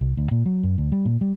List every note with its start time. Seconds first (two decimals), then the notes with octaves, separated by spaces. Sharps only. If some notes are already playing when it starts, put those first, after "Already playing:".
0.01 C2
0.17 D2
0.31 A#2
0.46 F#3
0.63 F#2
0.78 D2
0.92 G3
1.05 A#2
1.21 G3